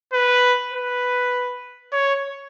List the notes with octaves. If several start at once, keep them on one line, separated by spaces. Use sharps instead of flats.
B4
B4
C#5